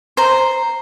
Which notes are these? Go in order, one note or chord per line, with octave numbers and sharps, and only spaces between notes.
C5 A#5